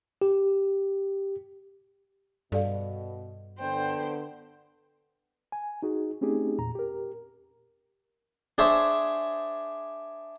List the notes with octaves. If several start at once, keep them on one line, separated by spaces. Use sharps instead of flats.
G4
G2 B2 A4 D5 F5
D3 B3 C5 G5
G#5
D#4 F#4 G#4
A3 C4 C#4 D#4 G4 G#4
E2 A#2 A#5
G4 A#4
D4 G#4 C5 C#5 E5